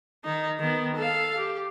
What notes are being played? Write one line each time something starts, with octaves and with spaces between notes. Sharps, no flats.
D#3 D#4
D#3 B3
A4 F5
G4